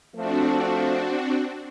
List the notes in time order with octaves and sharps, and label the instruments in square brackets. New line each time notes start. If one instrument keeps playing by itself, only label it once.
[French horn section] F3 A3 [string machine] C4 D4 F#4